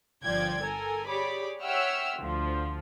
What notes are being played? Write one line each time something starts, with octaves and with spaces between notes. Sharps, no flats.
G1 F3 D5 G5 G#6
A4 A#4 G#5
G4 G#4 C#5 D5 B5 D6
C#5 E5 F#5 G5 E6 F6
D2 D3 F3